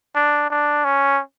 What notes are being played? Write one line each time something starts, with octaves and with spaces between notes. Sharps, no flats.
D4
D4
C#4